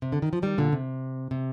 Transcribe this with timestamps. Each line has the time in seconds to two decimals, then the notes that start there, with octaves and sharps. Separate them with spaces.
0.02 C3
0.12 D3
0.22 D#3
0.33 F3
0.42 D#3 G3
0.58 A#2 D3
0.72 C3
1.31 C3